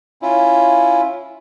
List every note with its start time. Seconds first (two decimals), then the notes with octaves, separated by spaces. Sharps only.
0.22 C#4 E4 F4